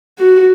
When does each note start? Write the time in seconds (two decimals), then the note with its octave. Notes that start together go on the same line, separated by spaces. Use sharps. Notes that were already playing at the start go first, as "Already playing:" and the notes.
0.18 F#4